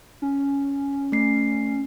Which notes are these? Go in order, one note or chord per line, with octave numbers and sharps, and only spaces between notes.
C#4
A3 C7